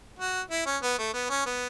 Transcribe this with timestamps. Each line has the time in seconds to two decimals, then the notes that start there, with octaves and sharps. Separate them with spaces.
0.19 F#4
0.51 E4
0.66 C#4
0.83 B3
0.99 A3
1.14 B3
1.30 C#4
1.46 B3